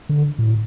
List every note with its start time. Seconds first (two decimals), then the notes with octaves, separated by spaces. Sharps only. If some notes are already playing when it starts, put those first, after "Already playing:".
0.09 D3
0.39 A2